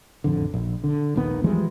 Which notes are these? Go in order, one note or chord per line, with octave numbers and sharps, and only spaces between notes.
A1 F2 D3
A#1
D3
D#1 A#1 D#3 B3
E3 F3 G3 G#3